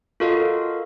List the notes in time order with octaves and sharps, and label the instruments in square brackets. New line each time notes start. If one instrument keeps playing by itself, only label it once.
[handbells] F4 F#4 A4 A#4 D#5 F5